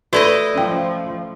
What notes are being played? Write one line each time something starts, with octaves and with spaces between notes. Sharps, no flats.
A3 E4 F#4 A4 B4 D5 D#5
F3 C#4 G5